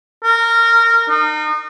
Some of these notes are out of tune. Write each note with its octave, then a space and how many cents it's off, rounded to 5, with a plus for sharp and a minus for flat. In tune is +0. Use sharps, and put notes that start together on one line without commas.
A#4 -20
D#4 -35